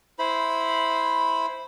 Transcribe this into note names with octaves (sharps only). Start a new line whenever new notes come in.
E4 C5 B5